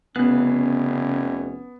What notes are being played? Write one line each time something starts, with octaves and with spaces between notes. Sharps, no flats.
F1 C#3 B3 C#4 F5 F#6